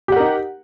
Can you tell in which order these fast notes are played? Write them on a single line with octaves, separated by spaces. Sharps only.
G4 F#5 A#4 D#4